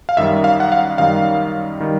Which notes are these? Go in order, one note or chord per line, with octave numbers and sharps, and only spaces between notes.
F5
F#2 D#3 G3 E5
F5
F#5
F5
F#2 D#3 G3 F5
D#3 G3